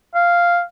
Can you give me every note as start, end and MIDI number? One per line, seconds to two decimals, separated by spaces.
0.15 0.62 77